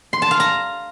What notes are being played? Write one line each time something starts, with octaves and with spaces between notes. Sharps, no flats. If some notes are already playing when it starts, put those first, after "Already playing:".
C6
A5
F5
A#5